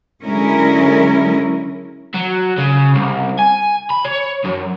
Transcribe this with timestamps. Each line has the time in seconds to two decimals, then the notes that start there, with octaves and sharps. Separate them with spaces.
0.24 D3 F#3 G#3 C#4 E4 A#4
2.15 F#3
2.58 C#3
2.95 C2
3.39 G#5
3.90 B5
4.05 C#5
4.44 F#2